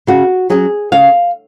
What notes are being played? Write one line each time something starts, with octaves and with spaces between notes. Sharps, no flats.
C#3 F#4
F#3 C#4 G#4
C#3 F5